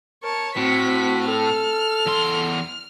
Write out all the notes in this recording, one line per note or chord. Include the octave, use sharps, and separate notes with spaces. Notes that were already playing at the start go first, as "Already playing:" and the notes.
A#4 C#5 A5
A2 C4 F#4 B6
A4 F6
E2 C6